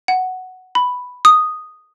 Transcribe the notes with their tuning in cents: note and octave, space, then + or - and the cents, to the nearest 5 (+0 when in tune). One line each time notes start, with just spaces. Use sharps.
F#5 +5
B5 +5
D#6 -5